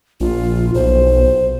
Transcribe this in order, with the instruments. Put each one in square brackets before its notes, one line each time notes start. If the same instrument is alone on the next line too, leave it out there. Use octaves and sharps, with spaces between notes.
[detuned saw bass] A#1 [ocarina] F4
[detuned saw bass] B1 [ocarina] C5